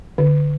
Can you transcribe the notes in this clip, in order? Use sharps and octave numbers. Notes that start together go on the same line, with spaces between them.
D3